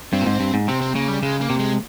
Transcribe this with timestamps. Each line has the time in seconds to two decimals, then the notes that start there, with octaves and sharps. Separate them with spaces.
0.13 G2 C4
0.21 A#2
0.26 G#2
0.40 G2
0.54 G#2
0.68 C3 C4
0.81 C4
0.95 C#3 A#3
1.08 G3
1.23 C#3 G#3
1.41 A#3
1.50 C3
1.59 G#3